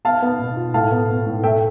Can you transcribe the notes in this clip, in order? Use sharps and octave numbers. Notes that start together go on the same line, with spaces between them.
B3 F5 A5
B3
B2
F4
A2 F5 A5
B3
B3
A2
A3 E5 G5